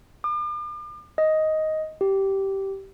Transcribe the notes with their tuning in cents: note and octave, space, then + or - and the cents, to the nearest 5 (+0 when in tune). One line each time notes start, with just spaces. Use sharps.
D6 +45
D#5 +10
G4 -10